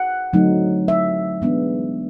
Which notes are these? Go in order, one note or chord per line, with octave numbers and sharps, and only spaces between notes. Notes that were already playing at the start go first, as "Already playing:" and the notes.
Already playing: F#5
D3 F#3 A3 C4 D#4
E5
E3 G#3 B3 D4